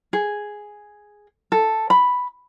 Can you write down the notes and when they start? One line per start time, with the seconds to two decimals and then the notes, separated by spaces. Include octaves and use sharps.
0.13 G#4
1.52 A4
1.90 B5